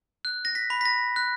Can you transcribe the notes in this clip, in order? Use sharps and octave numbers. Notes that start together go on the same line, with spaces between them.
F#6
A#6
B6
B5
B6
A#6
F#6